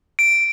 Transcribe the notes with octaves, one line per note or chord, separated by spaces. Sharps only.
D7